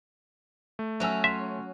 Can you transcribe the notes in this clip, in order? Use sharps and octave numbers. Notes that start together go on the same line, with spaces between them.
A3
F#3 C#4 E5 G#5 E6
E5 C6